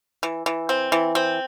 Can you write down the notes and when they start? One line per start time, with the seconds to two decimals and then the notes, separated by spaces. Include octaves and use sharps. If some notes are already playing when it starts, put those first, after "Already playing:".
0.23 E3
0.46 E3
0.69 C4
0.92 E3
1.15 C4